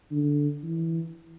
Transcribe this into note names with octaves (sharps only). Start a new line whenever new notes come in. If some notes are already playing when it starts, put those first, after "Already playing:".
D3
E3